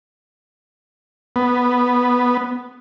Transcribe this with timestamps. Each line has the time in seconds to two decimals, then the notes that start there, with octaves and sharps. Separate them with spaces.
1.36 B3